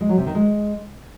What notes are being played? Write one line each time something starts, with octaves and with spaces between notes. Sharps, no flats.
G#3
F#3
C3
D#3
G#3